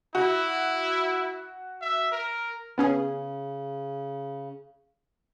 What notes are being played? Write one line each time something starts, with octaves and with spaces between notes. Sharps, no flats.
E4 F#4
E5
A#4
C#3 B3 C#4 G#4